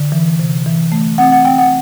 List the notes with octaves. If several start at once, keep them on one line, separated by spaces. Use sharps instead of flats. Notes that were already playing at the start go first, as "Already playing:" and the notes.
Already playing: D3
E3
C3
E3
A3
C4 F#5
F#5
C4 G5
F#5